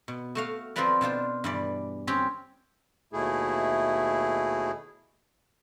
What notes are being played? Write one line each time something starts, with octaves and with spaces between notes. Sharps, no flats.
B2
A3 F#4 F5
F3 C4 F4 A#4 B4 D5
B2 D4 F4 C5
G2 E3 D5
C4 C#4 G4
D#2 B2 A3 E4 G#4